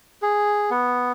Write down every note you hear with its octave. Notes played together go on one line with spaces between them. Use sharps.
G#4
B3